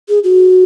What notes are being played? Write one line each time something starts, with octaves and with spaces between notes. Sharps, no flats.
G#4
F#4